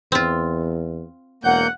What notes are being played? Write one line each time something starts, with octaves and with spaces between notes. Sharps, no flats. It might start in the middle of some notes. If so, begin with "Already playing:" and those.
E2 C4 F4
E1 A#3 F#5 G6